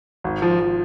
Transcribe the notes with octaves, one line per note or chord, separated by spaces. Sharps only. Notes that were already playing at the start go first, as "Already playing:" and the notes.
G#1
F3
F3